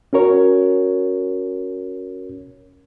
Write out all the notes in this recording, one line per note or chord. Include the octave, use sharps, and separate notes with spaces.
C#4 F#4 A#4 C#5